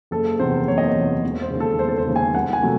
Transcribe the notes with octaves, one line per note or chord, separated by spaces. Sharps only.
F#1 A4
E2 C3 C5
F#1 C#5
D#5
C#5
E2 C3
E1
C5
D#2 C#3
A4
E1 C5
A4
C5
D#2 C#3
G#5
C2 F#5
G#5
C3 F#3 A3